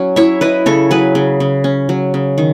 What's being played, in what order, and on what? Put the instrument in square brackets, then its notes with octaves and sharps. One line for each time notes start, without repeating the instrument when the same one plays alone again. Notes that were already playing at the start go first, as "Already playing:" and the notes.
Already playing: [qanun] F#3 C#4
E4 C#5 E5
E4 B4 D#5
C#3 A4 C#5
F#3 G#4 B4
C#3
C#3
C#4
F#3
C#3
D#3